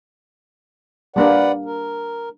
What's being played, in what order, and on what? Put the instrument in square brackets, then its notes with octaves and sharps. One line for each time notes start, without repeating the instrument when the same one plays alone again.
[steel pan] G3 A#3 D4 [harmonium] B4 D5 F#5
[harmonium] A#4